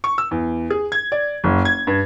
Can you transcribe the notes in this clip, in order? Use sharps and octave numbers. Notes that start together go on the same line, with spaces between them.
C#6
E6
E2
G#4
G#6
D5
F#1
G#6
G2